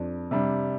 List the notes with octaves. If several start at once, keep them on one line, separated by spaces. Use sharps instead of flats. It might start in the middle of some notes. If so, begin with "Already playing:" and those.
Already playing: F2 F3 D4
C3 G3 D4